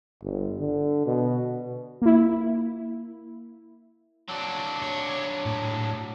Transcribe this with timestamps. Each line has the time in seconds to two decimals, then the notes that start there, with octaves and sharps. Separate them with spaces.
0.22 G1
0.60 D3
1.06 B2
2.02 A#3 E4
4.28 F#3 D4
4.82 C#5
5.46 A2